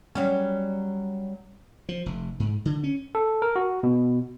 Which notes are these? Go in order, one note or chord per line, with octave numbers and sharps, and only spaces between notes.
F#3 G3 C#4
F3
F1
G#2
D3
C#4
A4
A#4
F#4
B2